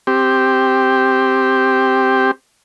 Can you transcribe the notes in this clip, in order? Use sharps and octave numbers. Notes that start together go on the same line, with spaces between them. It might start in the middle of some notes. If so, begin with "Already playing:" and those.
C4 G4